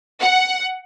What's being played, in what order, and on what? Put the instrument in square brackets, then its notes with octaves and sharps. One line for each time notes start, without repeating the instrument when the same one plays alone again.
[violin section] F#5